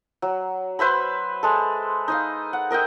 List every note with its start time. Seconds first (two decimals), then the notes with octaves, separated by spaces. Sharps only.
0.22 F#3
0.79 B4 C5 E5 B5
1.43 G#3 A4
2.08 D#4 D#5 F5
2.53 F#5
2.71 A#4 D#5 E5 G5